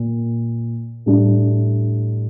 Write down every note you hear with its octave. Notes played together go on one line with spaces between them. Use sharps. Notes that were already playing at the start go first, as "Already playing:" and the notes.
Already playing: A#2
A2 G3 D4